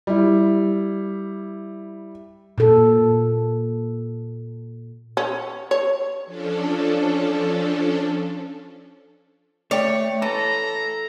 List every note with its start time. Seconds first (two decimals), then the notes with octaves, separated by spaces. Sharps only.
0.07 G3 E4
2.58 A#2 A4
5.17 C#4
5.71 C#5
6.26 F3 C#4 D4 A4
9.71 A3 G4 C#5 D5
10.22 E3 A4 A5 A#5